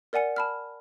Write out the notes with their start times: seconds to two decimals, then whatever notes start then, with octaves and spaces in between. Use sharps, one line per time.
0.13 A#4 D5 F#5 G#5 C#7
0.36 A5 B5 F6